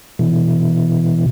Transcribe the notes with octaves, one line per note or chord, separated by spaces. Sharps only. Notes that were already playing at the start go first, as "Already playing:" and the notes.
B2 E3